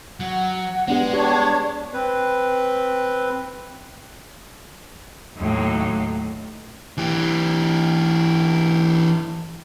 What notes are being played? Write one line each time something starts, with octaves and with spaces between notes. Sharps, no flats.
F#3 F#5
G#3 B3 D4 G4
D4 G4 C#5
C4 B4
D#2 A2 F#3
E3 G4